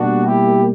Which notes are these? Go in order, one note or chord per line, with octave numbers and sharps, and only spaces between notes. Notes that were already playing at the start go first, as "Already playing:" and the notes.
Already playing: B2 G3 A#3 D4 F#4
E4 G4